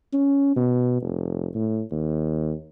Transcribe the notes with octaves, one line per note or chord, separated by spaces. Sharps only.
C#4
B2
F1
A2
D#2